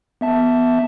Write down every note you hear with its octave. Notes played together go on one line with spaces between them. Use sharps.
B3 E5 A5